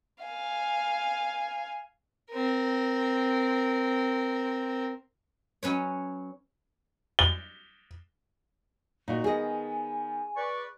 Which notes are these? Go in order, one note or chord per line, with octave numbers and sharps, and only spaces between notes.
F5 G#5
C4 A#4
F#3 C#4 B4 C#5
G7
A#2 D#4 F#4
D#3 B3 G#4 D#5 G#5
B4 D5 C#6